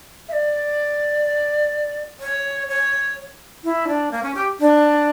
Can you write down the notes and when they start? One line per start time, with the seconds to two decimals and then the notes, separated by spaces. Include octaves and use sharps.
0.29 E5
0.33 D5
2.20 C#5
2.68 C#5
3.64 E4
3.88 D4
4.11 A#3
4.23 C#4
4.35 G4
4.60 D4